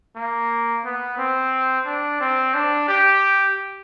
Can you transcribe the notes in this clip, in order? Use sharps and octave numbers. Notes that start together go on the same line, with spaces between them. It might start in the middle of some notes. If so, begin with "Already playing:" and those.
A#3
B3
C4
D4
C4
D4
G4